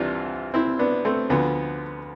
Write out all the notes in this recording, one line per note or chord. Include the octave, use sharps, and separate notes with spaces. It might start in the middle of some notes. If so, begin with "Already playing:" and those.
Already playing: C2 C3 E3 D4 F4
C4 E4
B3 D4
A3 C4
D2 D3 F3 B3